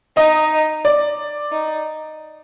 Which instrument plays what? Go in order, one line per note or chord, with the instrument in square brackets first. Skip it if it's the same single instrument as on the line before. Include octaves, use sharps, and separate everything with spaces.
[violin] D#4 [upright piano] D#5
[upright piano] D5
[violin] D#4